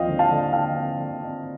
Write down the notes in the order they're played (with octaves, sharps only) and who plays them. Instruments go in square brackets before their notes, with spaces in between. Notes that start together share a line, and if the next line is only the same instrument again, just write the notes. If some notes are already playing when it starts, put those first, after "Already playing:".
Already playing: [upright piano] D#2 F3 C4 D#5 F5 G5
D3
F5 A5
D3
D3 F5 A5
C4
D3
C4